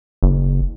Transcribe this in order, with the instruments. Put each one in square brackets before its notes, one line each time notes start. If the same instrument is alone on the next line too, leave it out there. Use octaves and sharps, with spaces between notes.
[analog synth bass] F#1